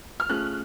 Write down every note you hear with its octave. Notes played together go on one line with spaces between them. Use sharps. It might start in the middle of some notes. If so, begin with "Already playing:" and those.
F6
A3 C#4 F4 G#4 F#6